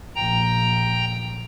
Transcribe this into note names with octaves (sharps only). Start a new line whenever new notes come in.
A#1 G5 A#5